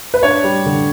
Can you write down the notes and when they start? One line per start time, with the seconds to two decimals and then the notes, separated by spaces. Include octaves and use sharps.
0.14 B4
0.23 D4 C#5
0.44 G3
0.66 D3